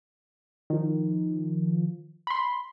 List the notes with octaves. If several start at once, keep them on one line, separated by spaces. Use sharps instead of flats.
D#3 F3
B5 C6